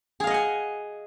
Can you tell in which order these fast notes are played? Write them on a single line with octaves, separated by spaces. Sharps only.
G#4 F5 D#5 F#5 G#5